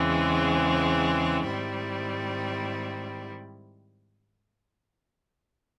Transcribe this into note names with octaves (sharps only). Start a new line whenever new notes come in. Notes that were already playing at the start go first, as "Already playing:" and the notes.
Already playing: E2 C#3 E3 G#3 C4
G#2 D#3 G3 C4 E4